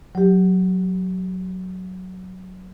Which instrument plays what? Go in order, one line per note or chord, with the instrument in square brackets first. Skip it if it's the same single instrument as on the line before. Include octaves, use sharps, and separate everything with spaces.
[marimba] F#3 G4